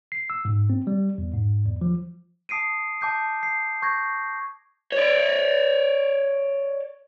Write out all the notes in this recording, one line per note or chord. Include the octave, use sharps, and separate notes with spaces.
C7
E6
G#2
C4
G3
E2
G#2
E2
F3
A5 D#6 C7 D7 D#7
A5 D6 G6 C7
C7
C#6 G6 G#6 A#6
C#5 D5